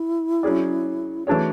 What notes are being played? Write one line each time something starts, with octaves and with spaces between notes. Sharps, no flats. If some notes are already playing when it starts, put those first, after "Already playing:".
Already playing: E4
F#3 C#4 G#4 D5
E3 A3 D4 F#4 G#4 C#5